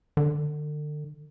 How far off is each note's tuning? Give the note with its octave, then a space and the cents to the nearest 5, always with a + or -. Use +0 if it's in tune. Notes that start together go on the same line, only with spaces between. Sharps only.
D3 +35